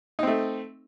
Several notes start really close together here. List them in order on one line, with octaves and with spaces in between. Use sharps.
D#4 C4 A3